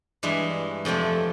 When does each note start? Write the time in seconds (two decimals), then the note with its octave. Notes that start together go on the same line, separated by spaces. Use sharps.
0.23 G2 E3 G#3
0.85 F2 C3 F3 A3